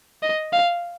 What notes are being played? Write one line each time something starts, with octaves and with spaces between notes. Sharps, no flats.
D#5
F5